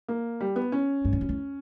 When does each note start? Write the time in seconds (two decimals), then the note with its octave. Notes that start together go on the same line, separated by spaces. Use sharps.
0.08 A#3
0.40 G3
0.56 B3
0.72 C#4
1.05 G2
1.13 E2
1.21 F#2
1.29 E2